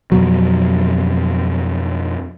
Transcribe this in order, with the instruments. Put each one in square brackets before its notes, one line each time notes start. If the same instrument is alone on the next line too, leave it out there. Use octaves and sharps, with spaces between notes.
[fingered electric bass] F2 B2 F#3